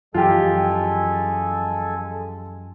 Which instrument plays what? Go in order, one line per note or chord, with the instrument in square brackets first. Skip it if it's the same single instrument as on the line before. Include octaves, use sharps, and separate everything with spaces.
[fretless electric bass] F#2 E3 F3 [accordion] G#3 A4 G#5 [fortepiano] F4 G4